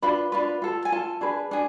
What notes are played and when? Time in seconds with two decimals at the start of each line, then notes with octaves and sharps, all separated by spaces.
0.02 D4 F4 B4 B5
0.32 D4 F4 B4
0.62 F4 A4
0.85 G#5
0.92 F4 A4 A5
1.21 D4 G#4 B4
1.51 D4 G#4